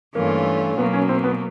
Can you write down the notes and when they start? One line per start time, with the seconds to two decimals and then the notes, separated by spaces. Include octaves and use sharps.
0.14 G2 E3 A3 A#3 C#4 F4
0.77 B2 F#3 A#3 B3
0.93 C#4
1.09 C4
1.24 B3